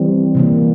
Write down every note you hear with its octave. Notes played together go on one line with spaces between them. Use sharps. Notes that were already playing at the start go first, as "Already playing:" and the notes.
Already playing: E3 G3 C4
C3 E3 A#3